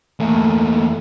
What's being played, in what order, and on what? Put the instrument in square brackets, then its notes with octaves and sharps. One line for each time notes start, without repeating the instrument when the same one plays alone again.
[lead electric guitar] E2 A#3 [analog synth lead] A3